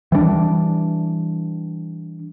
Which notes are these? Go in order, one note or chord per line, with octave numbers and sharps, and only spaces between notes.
E3 G3 A3 D4